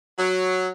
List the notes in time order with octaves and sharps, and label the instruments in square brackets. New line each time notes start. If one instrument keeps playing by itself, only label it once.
[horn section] F#3